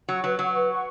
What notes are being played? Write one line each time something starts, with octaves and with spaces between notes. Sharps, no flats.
F#3 F#5 C#6
F#3 B4
F#3 F#5 C#6
B4
F#5 C#6